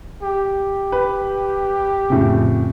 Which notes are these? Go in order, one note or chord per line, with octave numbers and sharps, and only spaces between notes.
G4
B4
F2 A2 C#3